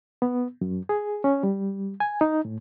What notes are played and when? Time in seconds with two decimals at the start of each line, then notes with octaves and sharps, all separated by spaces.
0.22 B3
0.61 F#2
0.89 G#4
1.24 C#4
1.43 G3
2.00 G#5
2.21 D#4
2.45 A2